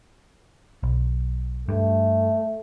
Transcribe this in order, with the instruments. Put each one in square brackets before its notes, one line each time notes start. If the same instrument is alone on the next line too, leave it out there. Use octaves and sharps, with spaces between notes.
[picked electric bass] B1
[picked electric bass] G2 [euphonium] A3